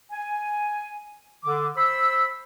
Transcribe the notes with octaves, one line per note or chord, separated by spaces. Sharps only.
G#5
D3 D6
C5 B5 E6